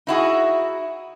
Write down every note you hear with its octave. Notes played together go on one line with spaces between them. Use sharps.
D#4 E4 F#4 G#4